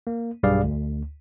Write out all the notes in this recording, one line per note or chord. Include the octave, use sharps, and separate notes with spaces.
A#3
B1 G2 G3 G#4 D5 F5
D2